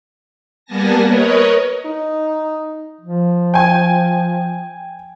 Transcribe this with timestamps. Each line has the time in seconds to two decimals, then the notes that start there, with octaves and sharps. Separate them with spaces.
0.65 G3 A#3 B3 G#5 A5 A#6
1.05 A#4 B4 C#5 D#5
1.85 D#4
3.01 F3
3.54 G5 G#5